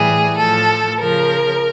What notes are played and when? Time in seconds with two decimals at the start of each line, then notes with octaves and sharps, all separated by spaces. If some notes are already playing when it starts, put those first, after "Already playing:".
Already playing: A2 E3 G3 G#4
0.37 A2 F3 A4
1.00 C#3 F3 A#4